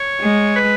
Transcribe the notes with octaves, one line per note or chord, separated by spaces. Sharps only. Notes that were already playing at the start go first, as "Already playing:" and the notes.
Already playing: C#5
G#3
B4